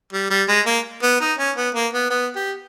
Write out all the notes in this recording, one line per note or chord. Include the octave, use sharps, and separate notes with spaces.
G3
G3
G#3
A#3
B3
D#4
C#4
B3
A#3
B3
B3
G4